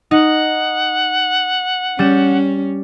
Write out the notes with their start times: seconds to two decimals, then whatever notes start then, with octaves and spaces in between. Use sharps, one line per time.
0.11 D#4 F#5
1.99 G3 C#4 G6 E7